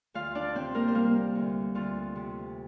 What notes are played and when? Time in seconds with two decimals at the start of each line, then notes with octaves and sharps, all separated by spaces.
0.14 D2 F4 F5
0.35 D4 D5
0.55 C3 C4 C5
0.75 A#3 A#4
0.88 C5
0.95 G3 A#3 A#4
1.35 D2
1.75 D2 F4
2.15 C3